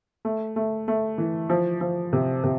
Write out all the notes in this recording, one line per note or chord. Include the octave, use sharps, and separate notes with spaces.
A3
A3
A3
E3
F3
F3
C3
C3